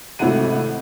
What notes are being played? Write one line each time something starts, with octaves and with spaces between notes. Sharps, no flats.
G#1 C3 A3 E4 F#5 D#7